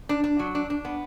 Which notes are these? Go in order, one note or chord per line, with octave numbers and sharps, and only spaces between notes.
D4
D4
F#3
D4
D4
B3